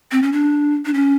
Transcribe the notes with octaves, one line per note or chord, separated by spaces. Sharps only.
C4
C#4
D4
D4
C#4